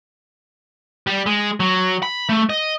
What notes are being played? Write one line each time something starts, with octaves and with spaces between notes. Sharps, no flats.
G3
G#3
F#3
B5
A3
D#5